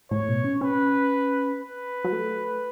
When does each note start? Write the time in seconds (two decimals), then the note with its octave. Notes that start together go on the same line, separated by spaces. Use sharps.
0.11 A2 C#5
0.28 B2
0.44 C#4
0.61 C#4 B4
1.62 B4
2.04 F#3
2.12 A3